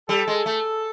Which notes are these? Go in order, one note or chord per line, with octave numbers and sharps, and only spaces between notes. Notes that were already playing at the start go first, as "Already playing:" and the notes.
G3 A4
G#3
A3